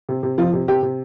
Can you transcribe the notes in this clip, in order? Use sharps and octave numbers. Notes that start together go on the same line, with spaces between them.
C3
C3
F2 F3 F4
C3
C3 G4
C3